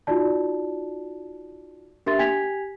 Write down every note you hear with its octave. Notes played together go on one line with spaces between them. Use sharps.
D#4 F4 F#4 D5 A5
D4 G4 A#4 E5 C6 A6
G4 G5 G#5 G#6 B6 F7